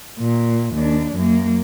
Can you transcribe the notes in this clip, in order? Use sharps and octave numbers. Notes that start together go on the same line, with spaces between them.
A#2
D#2 D4
F#2 A#3